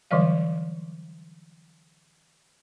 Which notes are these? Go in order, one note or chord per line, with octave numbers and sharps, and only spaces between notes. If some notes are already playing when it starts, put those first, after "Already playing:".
D3 E3 F#3 G3 D5 F5